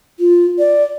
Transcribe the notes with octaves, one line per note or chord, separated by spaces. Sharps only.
F4
D5